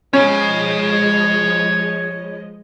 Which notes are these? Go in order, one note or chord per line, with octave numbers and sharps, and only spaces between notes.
F3 G#3 C#4 C#5 D#5 B5